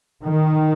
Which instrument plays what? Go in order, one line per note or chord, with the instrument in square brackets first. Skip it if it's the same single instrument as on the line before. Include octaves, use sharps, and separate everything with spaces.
[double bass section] D#3